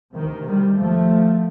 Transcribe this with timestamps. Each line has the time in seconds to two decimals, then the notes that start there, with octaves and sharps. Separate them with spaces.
0.14 D2 C3 D#3
0.46 D#3 G3
0.78 D#2 F3 A3